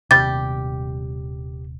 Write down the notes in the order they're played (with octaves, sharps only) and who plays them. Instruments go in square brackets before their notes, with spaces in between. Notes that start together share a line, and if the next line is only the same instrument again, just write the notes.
[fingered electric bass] D#1 C3 [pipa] G3 G4 [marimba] A6